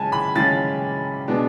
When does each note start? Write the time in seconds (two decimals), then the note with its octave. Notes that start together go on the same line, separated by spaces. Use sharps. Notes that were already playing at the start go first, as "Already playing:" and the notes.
Already playing: C#3 G#3 C#4 G#5 A5
0.12 B5
0.35 C#3 G#3 C#4 A6
1.28 B2 G#3 B3 D4